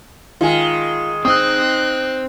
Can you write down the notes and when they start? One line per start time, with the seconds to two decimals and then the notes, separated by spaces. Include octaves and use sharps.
0.41 D#3 G#3 F4 G#5
1.25 C4 D#4 C5 D#6 E6 F#6